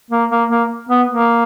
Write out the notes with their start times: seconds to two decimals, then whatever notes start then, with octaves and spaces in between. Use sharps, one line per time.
0.11 A#3
0.30 A#3
0.50 A#3
0.90 B3
1.10 A#3